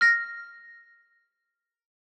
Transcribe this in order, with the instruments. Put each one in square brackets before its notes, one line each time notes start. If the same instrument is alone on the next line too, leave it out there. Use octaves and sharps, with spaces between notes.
[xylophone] F6 A#6